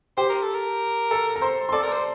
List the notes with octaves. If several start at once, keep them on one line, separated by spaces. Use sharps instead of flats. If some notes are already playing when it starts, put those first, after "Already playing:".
G4 C5 G5
A#4
A4
A#4
A4 A5
A#5
C5 C6
C6
A4 D5 D6
A#4
C5